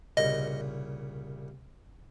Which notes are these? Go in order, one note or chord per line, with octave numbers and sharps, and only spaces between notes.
C2 A#2 C#3 D#5